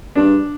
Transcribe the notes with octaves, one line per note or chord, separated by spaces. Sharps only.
G2 D4